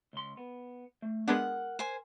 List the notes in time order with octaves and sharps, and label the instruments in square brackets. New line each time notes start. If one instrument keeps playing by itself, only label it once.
[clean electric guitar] C#2 C6
B3
A3
[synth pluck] G#3 B3 D4 [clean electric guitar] A#4 [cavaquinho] F#5
[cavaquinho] C5 G#5